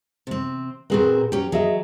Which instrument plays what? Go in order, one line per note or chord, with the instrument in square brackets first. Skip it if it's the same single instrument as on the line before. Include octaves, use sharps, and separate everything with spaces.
[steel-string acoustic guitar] C3 C4
[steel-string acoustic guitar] A#2 C4 A#4 [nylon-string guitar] F#4 G#4 B4
[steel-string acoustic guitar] F#3 C#4 [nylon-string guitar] G4
[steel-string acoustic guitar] F#3 [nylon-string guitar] G#4 D#5 E5